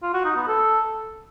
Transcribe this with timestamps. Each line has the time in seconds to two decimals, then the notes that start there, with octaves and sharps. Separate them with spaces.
0.03 F4
0.14 F#4
0.25 D#4
0.36 B3
0.47 A4